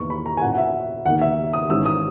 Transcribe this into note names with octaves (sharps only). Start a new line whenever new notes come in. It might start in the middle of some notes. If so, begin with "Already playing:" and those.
Already playing: E2 D#3 A#3 E4 C#6
B5
A#5
G#5
A#2 F#3 C#4 E4 F#5
F#5
E5
D#2 D#3 A#3 D#4 F#5
E5
D#6
G#1 G#2 E3 G#3 C#4 E6
D#6